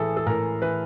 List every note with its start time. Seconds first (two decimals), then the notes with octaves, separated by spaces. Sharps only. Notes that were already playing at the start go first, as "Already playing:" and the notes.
Already playing: A2 E3 G#4 A4
0.17 A4
0.26 A2 A#4
0.62 E3 B4